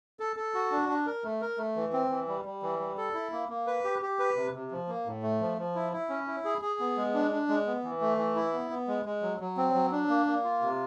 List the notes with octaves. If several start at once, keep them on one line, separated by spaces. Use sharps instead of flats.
A4
A4
F#4
D4
D4
A#4
A3
A#4
A3
E3
C4
E3
G3
G3
E3
G3
A4
E4
A#3
A#3
B4
G4
G4
B4
C3
C3
F3
A#3
A2
A3
F3
F3
E4
E4
C#4
E4
G#4
G#4
B3
G#3
D4
D4
G#3
B3
E3
A3
E3
E4
B3
B3
G#3
G#3
F#3
F#3
C4
F#3
D4
A#3
A#3
F4
C3